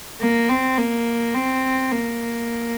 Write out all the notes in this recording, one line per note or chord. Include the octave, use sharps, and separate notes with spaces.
A#3
C4
A#3
C4
A#3